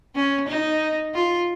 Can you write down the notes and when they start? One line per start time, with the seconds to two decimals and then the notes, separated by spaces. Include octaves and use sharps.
0.15 C#4
0.48 D#4
1.14 F4